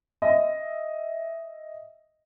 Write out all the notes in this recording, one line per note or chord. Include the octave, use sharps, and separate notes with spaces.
D#5 E5